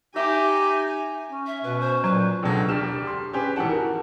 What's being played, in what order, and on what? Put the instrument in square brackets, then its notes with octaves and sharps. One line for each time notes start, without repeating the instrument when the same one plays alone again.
[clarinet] D#4 [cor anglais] G4 [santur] E5 D6 [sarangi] G#5
[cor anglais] C#4
[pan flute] E5
[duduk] B2 [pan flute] B4
[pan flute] C5
[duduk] A#2 [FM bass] F#3 [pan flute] B4
[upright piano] C#2 B2 D3 F#3 A4
E1 D2 D4 G4 F6 E7
C6
C#4 G4 G#4 B4
E2 A2 D#3 F#5 A5
F#4 A#4